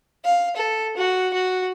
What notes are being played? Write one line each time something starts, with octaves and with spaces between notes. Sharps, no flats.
F5
A4
F#4
F#4